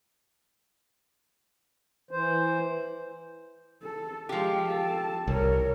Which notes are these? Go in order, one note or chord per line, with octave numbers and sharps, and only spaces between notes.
E3 C5
A4
F3 G#3 G4 F5
A4 A5
C2 A#4 C#5